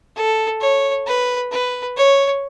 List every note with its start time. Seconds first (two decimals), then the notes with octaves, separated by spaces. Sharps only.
0.16 A4
0.61 C#5
1.06 B4
1.52 B4
1.97 C#5